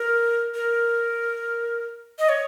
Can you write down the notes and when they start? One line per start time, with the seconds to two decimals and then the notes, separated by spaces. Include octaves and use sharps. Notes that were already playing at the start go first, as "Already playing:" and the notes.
Already playing: A#4
0.55 A#4
2.19 D#5
2.29 C#5